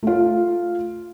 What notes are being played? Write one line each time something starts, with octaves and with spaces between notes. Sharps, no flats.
A3 F4